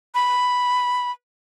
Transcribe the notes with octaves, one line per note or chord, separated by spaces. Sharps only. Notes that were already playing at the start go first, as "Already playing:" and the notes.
B5